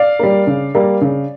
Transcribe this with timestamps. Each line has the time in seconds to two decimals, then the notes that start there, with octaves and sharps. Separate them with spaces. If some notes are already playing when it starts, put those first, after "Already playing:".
Already playing: D5 F5
0.19 G3 A#3
0.47 C#3
0.75 G3 A#3
1.01 C#3